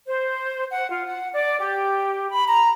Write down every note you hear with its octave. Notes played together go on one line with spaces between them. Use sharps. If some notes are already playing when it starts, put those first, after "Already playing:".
C5
F#5
F4
F#5
D5
G4
B5
A#5